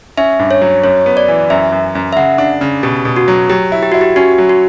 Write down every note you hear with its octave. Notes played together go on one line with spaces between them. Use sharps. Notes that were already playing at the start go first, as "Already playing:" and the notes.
C#4 E5
G2
C#5
F#3
F#2 C#5
B3
D5
E3
F#2 E5
F#2
F#2
E5
C#3 F#5
D4
C#3
B2 G4
B2
F#4
F#3
F#3 G4
E4
G4
E4 F#4
G4
C#4 F#4
F#3
F#4